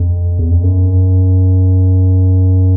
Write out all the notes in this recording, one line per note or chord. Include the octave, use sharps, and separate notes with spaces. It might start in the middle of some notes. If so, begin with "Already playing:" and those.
Already playing: F2
E2
F2
F#2